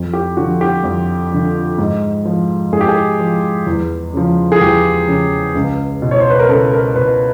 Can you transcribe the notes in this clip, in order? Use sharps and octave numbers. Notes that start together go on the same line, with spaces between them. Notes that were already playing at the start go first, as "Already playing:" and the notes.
Already playing: F2
G4
D3 F3 F#4
G4
F2
D3 F3
G#2
F3
G#2 G#4
G4
G#4
F3
E2
C#3 F3
G#4
E2 G4
C#3 F3
C#2
B2
C#5
C5
B4
A#4
C#2 A4
A#4
B2 B4